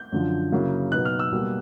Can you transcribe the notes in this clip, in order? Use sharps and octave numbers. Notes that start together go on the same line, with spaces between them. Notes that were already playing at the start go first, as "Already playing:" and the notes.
Already playing: G6
F#2 D3 F3
C#3 F#3 A#3 C#4 E4
B2 F#3 B3 D#4 F#6
F6
E6
B2 G3 A#3